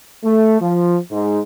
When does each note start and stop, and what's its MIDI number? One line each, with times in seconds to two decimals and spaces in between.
0.24 0.57 57
0.61 0.97 53
1.12 1.40 44